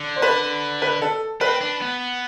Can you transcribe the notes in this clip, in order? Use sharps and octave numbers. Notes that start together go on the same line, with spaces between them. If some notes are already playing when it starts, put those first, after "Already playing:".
Already playing: D3
C5
B4
B4
A4
C4 B4
D4
B3